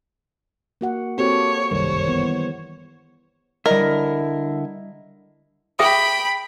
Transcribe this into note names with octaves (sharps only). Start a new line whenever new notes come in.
A#3 F#4 F#5
A#3 C4 F#4 G4 A4 C#5
G1 C2 F#2 D#3 G3 C5 C#5
E3 B3
D3 G3 E4 A#4 D#5
G#4 E5 G5 B5 D#6